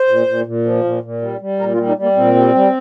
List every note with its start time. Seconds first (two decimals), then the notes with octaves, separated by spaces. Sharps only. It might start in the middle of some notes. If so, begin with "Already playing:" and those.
Already playing: C5
0.08 A#2
0.27 A#2
0.46 A#2
0.65 F3
0.84 A#2
1.03 A#2
1.22 G3
1.41 G3
1.59 A#2 A#4
1.74 F4
1.78 G3
1.87 D#4
1.97 G3
2.02 A#3
2.16 A#2 C4
2.35 G3
2.55 G3